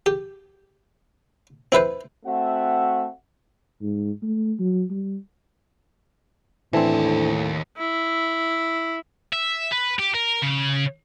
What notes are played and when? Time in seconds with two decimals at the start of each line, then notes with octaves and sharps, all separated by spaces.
0.06 G4
1.72 C4 E4 B4 C5
2.26 A3 C4 F#4 E5 F#5
3.82 G#2
4.22 A3
4.59 F#3
4.90 G3
6.73 D#2 A2 E3 C4 D4 A4 C5 A5
7.77 E4
9.33 E5
9.72 B4
9.99 G4
10.14 A#4
10.42 C#3